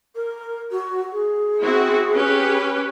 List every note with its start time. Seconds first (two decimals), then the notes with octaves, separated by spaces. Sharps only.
0.15 A#4
0.71 F#4
1.12 G#4
1.60 C4 E4 F#4
2.14 C#4 G4 B4